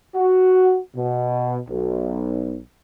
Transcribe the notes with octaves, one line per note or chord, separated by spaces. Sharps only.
F#4
B2
B1